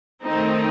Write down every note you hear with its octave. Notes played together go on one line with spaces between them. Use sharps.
D#3 A3 C4 D#4